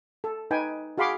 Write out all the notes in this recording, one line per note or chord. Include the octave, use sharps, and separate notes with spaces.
A4
D#4 B4 G5 G#5
F#4 G#4 F5 B5 C6 D6